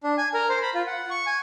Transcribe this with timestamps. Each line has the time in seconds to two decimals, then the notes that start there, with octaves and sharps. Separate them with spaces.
0.03 D4
0.18 G#5
0.34 A#4
0.49 C5
0.62 B5
0.74 F4
0.87 F#5
1.10 C#6
1.26 G#5